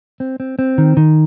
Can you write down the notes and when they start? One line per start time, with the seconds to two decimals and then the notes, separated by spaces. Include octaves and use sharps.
0.20 C4
0.40 C4
0.59 C4
0.78 D#3
0.97 D#3